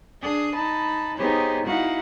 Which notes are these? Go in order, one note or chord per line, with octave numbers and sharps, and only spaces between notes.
D4 G#4 D#6
D#4 A5 B5
B3 D#4 G4 G#4 C5 C#5
D#4 E4 F#4 F5 F#5